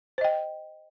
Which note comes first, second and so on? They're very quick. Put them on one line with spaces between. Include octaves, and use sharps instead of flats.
C5 D#5 G5